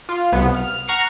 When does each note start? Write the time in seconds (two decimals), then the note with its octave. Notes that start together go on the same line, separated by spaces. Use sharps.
0.09 F4
0.32 C2 B3
0.55 F6
0.88 F#5 A#5 C#6 F6 C7 C#7